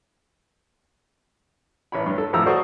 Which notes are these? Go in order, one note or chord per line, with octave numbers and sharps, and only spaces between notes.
A1 C#5 B5
G2
A4
G#1 A2 F3 A#5 E6
F#4 A4 C5 D5 C#6 D#6